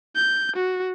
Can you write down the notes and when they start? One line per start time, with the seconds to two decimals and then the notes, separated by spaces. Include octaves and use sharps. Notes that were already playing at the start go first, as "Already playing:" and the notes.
0.16 G6
0.56 F#4